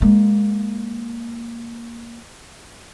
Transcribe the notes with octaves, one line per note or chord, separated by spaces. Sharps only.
G#3 A#3